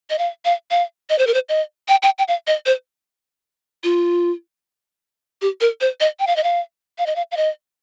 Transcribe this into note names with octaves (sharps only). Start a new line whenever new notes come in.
D#5
F5
F5
F5
D#5
C5
A#4
C5
D#5
G5
G5
G5
F5
D#5
C5
F4
G4
A#4
C5
D#5
G5
F5
D#5
F5
F5
D#5
F5
F5
D#5